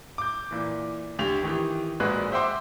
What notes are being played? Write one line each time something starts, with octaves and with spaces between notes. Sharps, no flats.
D6 G6
A#2 E3
D2 G4 F7
D#3 E3 G4
A#1 A#2 G#3 F#4 B4 F#6
C5 E5 F#5 G5 C6 D6